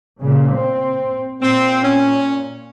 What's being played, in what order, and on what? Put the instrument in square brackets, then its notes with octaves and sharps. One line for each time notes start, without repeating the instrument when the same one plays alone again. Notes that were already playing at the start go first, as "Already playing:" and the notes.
[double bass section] A#2 C#3
C4
[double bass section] A#2 [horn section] C4
[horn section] C#4